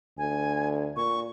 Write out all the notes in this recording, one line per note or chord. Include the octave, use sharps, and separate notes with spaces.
D2 G#5
A#2 C#6